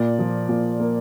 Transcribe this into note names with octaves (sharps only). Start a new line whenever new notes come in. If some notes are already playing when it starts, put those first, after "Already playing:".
Already playing: A#2 D5
F3
A#2
A#3